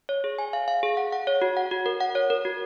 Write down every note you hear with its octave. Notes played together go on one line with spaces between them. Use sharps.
C#5
G#4
G#5
F5
F5
G#4
F#5
F#5
C#5
F#4
F#5
F#4
A#4
F#5
C#5
A#4
F#4